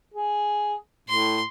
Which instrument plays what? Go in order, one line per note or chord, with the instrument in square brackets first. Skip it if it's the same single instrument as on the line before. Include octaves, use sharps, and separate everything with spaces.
[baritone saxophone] G#4
[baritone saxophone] A2 [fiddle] C6